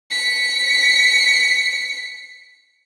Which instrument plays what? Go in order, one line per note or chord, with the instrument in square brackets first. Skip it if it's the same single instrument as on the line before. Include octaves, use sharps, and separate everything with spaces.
[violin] B6 C#7